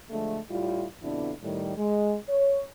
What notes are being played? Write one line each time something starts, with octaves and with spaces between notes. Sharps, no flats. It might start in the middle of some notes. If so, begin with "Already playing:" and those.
D3 F3 G#3 A3
A2 G3 E4 F4
F2 B2 D3 B3 D4 E4
A2 D#3 G3
G#3
C#5